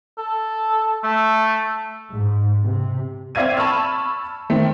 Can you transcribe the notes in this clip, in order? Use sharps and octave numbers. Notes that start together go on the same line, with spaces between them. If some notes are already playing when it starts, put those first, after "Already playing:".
A4
A3
G#2
C3
C4 D5 E5 F5 G#6 D#7
A5 B5 C#6 E6 F6
D#3 A3 C4